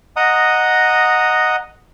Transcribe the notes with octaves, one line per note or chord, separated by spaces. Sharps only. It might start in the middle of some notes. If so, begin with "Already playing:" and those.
D#5 F#5 A#5 D#6